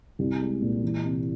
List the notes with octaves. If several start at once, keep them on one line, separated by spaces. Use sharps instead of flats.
C2
G#3
A#2
E3
C3